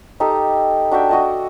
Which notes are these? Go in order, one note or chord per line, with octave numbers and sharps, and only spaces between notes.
D#4 G4 A4
D4 F#4 E5 G5
F#4 D#5 A5